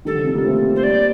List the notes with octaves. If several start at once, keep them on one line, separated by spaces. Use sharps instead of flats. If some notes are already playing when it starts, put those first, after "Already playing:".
D#3 G3 A4
D3 F3
C3 D#3
G3 A#3
A3 C4
C5
G3 A#3 D5